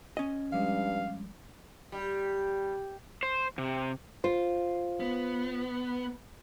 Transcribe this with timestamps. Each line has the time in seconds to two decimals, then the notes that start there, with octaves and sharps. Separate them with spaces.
0.17 C#4 D#5
0.52 G2 F3 G3 G#3 F5
1.92 G3
3.23 C5
3.58 C3
4.24 F4 C5
5.00 B3